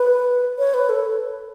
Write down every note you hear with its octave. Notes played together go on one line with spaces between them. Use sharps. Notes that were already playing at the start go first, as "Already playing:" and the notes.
Already playing: B4
C#5
B4
A4